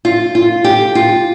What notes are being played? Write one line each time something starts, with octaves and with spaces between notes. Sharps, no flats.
F4
F4
G4
F4